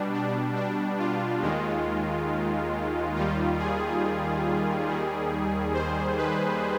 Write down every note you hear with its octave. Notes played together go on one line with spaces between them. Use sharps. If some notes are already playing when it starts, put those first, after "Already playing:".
Already playing: B2 G3 D4
D4
D4
F4
D#2 D#3 G#3
D#2 D#3 G3 F4
G#4
D#2 D#3 G3
C5
B4